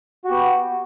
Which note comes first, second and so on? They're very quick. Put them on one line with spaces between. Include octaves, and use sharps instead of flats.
F#4 G4 B3